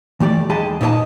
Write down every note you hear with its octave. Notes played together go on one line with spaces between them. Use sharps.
E3 A3 G4 D5
D#2 G#3 G4 G#4 D#5 A5
A#2 D#4 E4 C#5 D#5 A5